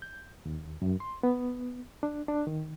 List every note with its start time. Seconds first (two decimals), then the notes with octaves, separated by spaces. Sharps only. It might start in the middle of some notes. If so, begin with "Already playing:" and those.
0.02 G6
0.46 D#2
0.82 F#2
1.00 C6
1.23 B3
2.03 D4
2.28 D4
2.47 D#3